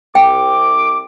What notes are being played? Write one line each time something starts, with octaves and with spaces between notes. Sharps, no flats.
C2 C3 G5 D6